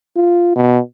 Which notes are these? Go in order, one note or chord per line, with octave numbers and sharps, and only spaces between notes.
F4
B2